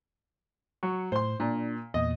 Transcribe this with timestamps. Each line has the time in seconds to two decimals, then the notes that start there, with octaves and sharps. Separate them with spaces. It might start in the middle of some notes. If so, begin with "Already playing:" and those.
0.83 F#3 C#6
1.12 A2 C5 C6
1.40 A#2 D4
1.94 E2 A#2 D#5